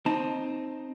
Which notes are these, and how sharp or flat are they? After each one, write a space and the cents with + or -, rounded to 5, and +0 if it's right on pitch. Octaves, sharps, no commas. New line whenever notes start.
C4 +10 D#4 +0 A5 +0